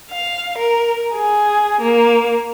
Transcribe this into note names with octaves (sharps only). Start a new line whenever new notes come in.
F5
A#4
G#4
A#3